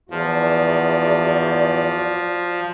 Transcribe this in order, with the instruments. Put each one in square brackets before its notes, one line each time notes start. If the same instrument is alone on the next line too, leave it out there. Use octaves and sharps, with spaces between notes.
[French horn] E2 [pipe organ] F3 [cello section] F#4 D5